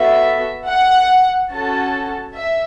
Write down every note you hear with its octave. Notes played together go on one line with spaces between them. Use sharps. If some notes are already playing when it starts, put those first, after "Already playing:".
Already playing: B3 F#4 A4 E5
F#5
C#4 F#4 A4 A5
E5